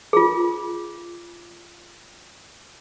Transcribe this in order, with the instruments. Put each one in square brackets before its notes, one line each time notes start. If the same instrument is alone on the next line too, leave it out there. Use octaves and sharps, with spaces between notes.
[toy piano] F4 G#4